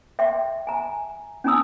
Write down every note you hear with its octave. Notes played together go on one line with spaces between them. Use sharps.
E5 G5 C6
G#5 A#5
C#4 D#4 G#5 A#5 D#6 E6